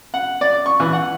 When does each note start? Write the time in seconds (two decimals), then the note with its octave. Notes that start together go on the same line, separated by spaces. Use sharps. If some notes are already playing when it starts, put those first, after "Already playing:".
0.14 F#5
0.41 D5
0.66 C#6
0.80 E3
0.93 F#5